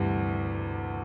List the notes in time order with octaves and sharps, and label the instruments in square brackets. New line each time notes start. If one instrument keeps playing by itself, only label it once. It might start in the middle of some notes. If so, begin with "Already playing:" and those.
Already playing: [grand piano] D2 C3 E3 G3 [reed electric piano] G2